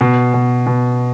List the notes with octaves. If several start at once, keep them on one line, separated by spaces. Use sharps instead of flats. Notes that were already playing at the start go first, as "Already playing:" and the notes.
B2
B2
B2